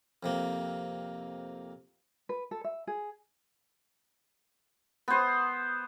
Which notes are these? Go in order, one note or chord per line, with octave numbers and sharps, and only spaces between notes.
F2 C3 A#3
B4
A4
E5
G#4
B3 C5